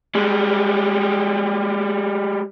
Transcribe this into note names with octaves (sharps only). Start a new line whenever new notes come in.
G3 G#3